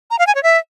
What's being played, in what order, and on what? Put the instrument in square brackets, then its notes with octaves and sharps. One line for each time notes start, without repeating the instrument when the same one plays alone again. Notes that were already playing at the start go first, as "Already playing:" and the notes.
[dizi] A#5
F5
G#5
C#5
E5